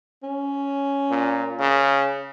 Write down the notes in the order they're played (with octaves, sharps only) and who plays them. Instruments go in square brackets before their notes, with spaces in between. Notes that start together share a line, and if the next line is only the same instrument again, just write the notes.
[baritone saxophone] C#4
[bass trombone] A#2
C#3